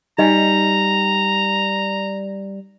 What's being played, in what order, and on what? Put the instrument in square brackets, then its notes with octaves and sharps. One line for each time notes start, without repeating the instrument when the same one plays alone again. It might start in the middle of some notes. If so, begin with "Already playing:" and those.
[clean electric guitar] G3 [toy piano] D#4 D#5 G#5 [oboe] A#5